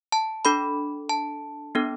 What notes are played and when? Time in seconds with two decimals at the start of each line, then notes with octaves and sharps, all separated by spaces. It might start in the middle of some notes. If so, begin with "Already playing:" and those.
0.12 A5
0.45 D4 A4 B5
1.09 A5
1.75 B3 D4 A4